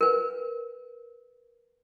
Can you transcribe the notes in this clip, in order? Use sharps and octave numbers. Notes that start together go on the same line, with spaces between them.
A#4 B4